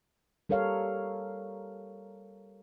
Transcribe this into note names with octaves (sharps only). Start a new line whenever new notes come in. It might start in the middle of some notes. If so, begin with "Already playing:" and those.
G3 A4 A#4 C#5 F5